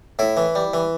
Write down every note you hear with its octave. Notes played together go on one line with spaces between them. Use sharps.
A2 E4
E3
G3
E3